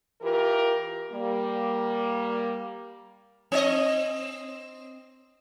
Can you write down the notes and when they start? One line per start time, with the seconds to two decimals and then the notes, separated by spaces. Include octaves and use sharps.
0.22 E3 F4 G4 A#4
1.11 G3 A#3
3.52 C4 D#5